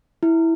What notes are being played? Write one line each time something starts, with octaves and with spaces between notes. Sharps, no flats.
E4